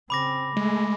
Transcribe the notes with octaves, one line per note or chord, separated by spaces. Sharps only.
C#3 C4 B5 D6 A#6
G#3 A3